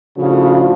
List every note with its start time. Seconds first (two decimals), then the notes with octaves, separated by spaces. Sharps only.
0.17 A2 C#3 F3 A3 D4 F#4